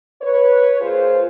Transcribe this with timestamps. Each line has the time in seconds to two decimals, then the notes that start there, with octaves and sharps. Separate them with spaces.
0.21 B4 C#5
0.80 A#2 F4 G#4 C5